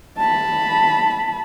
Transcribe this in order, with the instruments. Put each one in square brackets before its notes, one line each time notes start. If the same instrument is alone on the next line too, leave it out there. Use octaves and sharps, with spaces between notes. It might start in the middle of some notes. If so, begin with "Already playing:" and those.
[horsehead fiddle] A5 B5